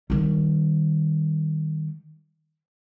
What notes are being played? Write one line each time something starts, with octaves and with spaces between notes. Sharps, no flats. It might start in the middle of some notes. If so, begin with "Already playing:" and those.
D#3 G3